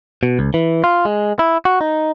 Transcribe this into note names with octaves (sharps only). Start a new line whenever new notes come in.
B2
C#2
E3
F4
G#3
E4
F#4
D#4